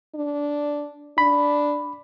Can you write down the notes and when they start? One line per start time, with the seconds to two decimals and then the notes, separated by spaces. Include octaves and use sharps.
0.15 D4
1.18 D4 B5